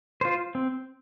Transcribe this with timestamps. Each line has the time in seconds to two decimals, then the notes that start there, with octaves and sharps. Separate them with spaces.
0.21 F4 C5
0.55 C4